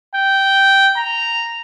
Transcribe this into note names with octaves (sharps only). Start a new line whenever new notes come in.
G5
A#5